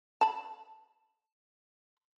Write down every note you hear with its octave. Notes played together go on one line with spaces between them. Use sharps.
A5 B5